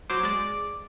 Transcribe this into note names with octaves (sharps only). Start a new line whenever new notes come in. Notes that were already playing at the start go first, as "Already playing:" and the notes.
F#3 C5 D6
G#3 D5